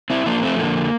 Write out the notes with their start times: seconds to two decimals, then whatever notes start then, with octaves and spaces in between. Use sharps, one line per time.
0.10 C4 E4
0.26 F3 A#3 D4
0.43 A3 C4
0.59 D3 A#3